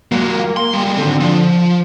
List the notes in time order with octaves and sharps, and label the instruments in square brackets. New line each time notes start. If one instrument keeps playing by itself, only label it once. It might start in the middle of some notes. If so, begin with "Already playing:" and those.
[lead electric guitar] F#3 G#3 [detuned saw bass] A#3
[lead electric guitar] C6
G3 G#3
[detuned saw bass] D3 [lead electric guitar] D#3 C4
[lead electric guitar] F3